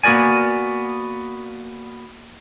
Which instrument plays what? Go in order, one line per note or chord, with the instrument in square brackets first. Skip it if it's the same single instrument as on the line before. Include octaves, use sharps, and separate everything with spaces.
[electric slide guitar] A#3 B3 F#4 A#4 D5 G#5